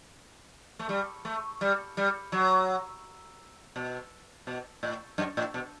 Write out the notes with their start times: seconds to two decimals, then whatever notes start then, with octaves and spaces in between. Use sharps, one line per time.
0.79 A3
0.89 G3
1.25 A3
1.61 G3
1.97 G3
2.32 F#3
3.76 B2
4.47 B2
4.83 A2
5.18 F#2
5.37 A2
5.54 B2